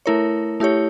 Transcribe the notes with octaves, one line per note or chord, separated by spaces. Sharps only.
A3 E4 A#4 C#5
A3 E4 G4 C#5